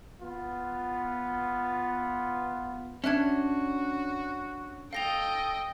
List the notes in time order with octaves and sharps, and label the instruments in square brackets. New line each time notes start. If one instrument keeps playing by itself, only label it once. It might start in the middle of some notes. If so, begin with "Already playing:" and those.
[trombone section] B3 F4
[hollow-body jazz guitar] C#4 D4 [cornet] F#4 [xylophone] E5 F#6 G#6
[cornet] A4 [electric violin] D#5 G5 [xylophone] F5 A#6 F7